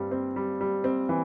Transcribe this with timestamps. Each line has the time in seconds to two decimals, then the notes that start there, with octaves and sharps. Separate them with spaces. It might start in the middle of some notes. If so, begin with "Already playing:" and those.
Already playing: G2 G3 C4
0.11 C4
0.36 G3
0.61 G3
0.84 C4
1.09 E3